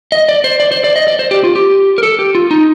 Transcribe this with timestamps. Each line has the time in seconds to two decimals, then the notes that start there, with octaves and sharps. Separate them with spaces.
0.12 D#5
0.29 D5
0.44 C5
0.60 D5
0.72 C5
0.84 D5
0.96 D#5
1.08 D5
1.19 C5
1.31 G4
1.44 F4
1.55 G4
1.98 A#4
2.03 A4
2.19 G4
2.35 F4
2.51 D#4